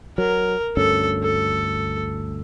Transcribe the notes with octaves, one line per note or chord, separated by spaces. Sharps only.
F#3 A#4
D2 G2 C#4 A4
A4